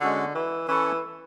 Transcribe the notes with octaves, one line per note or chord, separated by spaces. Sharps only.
D3 G#3 C#4 F#4
E3
E3 C#4 E4 A4 C#5